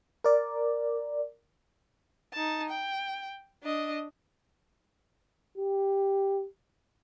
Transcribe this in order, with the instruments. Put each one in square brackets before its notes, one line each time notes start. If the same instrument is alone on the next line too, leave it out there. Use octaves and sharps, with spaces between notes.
[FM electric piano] A#4 D5
[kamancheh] D#4 A5
G5
D4 D#5
[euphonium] G4